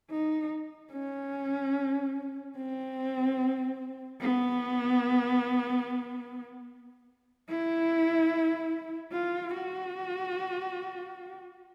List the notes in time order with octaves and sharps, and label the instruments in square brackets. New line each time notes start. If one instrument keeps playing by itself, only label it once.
[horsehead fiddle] D#4
C#4
C4
B3
E4
F4
F#4